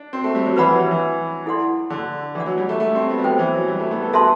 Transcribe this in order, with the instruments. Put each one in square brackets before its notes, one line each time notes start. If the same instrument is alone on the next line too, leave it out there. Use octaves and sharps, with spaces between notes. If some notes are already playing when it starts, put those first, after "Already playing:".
Already playing: [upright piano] D4
C4
A3
G3
F#3
[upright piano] E3 [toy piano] B4 F#5 B5
[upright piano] E3
F#3
E3
E3
[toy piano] E4 A4 D5 F#5 C6
[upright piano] D3
[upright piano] E3 [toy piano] A4
[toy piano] D5 F#5
[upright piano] F#3
G3
A3
A3
C4
B3
G3
[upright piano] F#3 [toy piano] A4 C5 G5
[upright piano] E3
F#3
G3
A3
B3
A4
[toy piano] F#4 A4 E5 A5 C6 [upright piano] B4